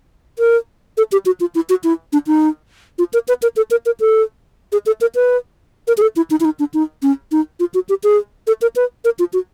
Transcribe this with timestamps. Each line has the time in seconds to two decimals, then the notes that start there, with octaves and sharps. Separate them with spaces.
0.39 A#4
0.97 A4
1.12 G4
1.26 F#4
1.40 F4
1.55 E4
1.69 F#4
1.84 E4
2.13 D4
2.27 D#4
2.99 F4
3.13 A#4
3.28 B4
3.42 A#4
3.57 A4
3.71 A#4
3.86 A#4
4.00 A4
4.72 G#4
4.86 A4
5.01 A#4
5.15 B4
5.88 A#4
5.97 G#4
6.02 A4
6.16 E4
6.31 D#4
6.40 E4
6.45 D#4
6.59 D4
6.74 D#4
7.02 C#4
7.32 D#4
7.60 F4
7.74 F#4
7.89 G4
8.04 G#4
8.47 A4
8.62 A#4
8.76 B4
9.05 A#4
9.19 F4
9.33 F#4